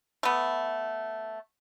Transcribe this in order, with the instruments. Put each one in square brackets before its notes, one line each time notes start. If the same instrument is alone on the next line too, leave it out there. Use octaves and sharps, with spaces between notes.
[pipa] A3 B3